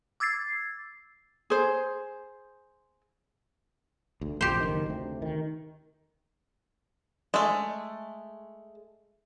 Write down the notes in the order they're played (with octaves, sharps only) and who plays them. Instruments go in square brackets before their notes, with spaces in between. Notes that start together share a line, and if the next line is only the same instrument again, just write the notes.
[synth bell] D6 E6 G#6 A6 C7
[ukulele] G#4 C5
[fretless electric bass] D2
[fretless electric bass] A#1 F2 [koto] G4 C5
[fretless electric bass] F#1 D#3
D2 C3
D#3
[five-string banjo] G#3 A3